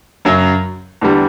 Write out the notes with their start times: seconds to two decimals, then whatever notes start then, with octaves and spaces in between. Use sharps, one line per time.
0.25 F#2 C#3 F#3
1.01 E2 D3 G3